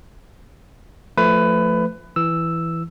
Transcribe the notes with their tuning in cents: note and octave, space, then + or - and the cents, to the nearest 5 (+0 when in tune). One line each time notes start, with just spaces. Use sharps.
F3 +0 A3 +10 B4 +20
E3 +5 E6 +0